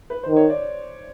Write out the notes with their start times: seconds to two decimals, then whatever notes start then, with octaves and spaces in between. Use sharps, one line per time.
0.10 B4
0.23 C5
0.29 D#3
0.37 C#5
0.50 D5